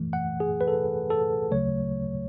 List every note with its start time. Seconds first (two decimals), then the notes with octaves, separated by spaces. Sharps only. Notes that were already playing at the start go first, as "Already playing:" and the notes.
Already playing: F#2 E3 A3
0.13 F#5
0.40 G#4
0.61 B4
0.68 A4
1.10 A4
1.51 D2 C#3 F#3 A3 C#5